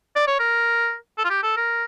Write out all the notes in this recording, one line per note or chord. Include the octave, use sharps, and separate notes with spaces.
D5
C#5
A#4
A4
F4
G4
A4
A#4